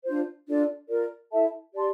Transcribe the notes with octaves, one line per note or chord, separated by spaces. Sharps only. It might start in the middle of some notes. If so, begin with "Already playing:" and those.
D4 F4 C5
D4 F4 A4 D5
F4 A#4 D5
E4 A4 E5 A5
G4 D5 A5 C6